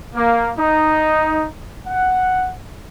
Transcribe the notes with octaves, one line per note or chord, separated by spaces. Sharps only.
A#3
D#4
F#5